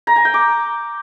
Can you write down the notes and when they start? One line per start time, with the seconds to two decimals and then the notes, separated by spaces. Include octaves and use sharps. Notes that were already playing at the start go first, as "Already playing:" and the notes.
0.07 A#5
0.16 G#5
0.25 G5
0.34 D6